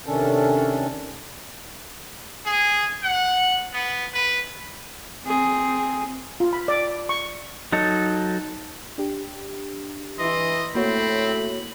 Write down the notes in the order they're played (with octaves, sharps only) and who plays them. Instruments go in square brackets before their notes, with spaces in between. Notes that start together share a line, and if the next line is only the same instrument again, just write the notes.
[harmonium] C3 D#3 C#4 D4 A4
[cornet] G#4
F#5
B3
B4
[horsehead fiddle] C4 G#4
[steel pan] F4
B5
D5
C#6
[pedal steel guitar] F#3 D#4 A4
[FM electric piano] D4 G4
[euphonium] E3 [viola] E4 C6 [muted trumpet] D#5
[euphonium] A2 [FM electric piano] A#3 F#4 C#5 [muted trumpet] C4 [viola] B5